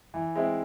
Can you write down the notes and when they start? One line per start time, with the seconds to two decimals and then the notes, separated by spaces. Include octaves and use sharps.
0.14 E3
0.35 G#3 C4 E4